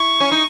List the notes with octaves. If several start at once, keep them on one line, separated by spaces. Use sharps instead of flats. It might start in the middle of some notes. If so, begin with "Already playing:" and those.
Already playing: E4 C#6
C#4
D#4